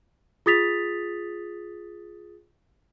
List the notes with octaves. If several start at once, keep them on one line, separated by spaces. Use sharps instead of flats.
F4 G#4 D#6 A6 B6 F7